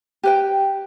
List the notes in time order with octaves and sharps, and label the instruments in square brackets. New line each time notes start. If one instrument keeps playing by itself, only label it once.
[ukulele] G4 B4 G5